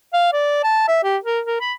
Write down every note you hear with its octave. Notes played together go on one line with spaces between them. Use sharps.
F5
D5
A5
E5
G4
A#4
A#4
B5